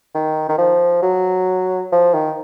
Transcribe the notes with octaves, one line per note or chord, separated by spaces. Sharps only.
D#3
D#3
F3
F#3
F3
D#3